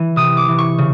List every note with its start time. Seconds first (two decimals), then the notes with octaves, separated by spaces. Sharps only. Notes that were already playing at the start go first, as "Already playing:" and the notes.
Already playing: E3
0.16 C3 D#6
0.37 D6
0.48 E3
0.58 C#6
0.78 C#3